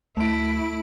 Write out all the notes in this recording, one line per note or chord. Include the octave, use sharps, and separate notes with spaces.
D2 A3 E4 D7